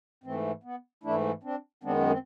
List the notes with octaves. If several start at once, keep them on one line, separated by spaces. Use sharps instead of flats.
G#2 E3 A3 C4
B3
G#2 E3 A3 D4 E4
C4 D4
F#2 D#3 G#3 B3 C4 D4
C4